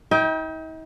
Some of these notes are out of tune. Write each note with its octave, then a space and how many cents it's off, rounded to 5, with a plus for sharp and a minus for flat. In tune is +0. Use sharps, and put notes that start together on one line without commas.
D#4 +45 D#5 +45 G5 +0